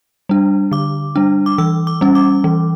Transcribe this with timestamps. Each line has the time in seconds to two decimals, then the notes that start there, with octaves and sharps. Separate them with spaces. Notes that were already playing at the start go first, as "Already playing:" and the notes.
0.29 G3 D4
0.71 D3 D6
1.16 G3 D4
1.46 D6
1.58 E3 E6
1.87 D6
2.01 G3 C#4
2.15 D6
2.44 E3